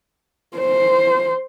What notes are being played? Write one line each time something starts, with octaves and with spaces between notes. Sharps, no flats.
C5